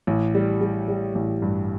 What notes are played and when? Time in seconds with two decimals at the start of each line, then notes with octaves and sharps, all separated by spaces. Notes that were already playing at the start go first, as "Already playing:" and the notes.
0.07 A1
0.35 G3
0.61 G3
0.88 G3
1.15 A1
1.42 G2